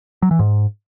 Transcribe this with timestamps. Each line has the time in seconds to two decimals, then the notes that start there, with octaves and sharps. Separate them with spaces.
0.22 F#3
0.31 E3
0.39 G#2